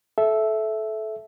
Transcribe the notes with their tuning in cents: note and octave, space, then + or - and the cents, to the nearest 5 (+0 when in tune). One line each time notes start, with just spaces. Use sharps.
A4 -20 E5 +0